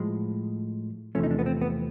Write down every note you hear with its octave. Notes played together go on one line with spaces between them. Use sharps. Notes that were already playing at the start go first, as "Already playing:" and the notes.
Already playing: A2 F3 G#3
E2 C3 F3 A3 C#4
D#4
D4
B3
C4
B3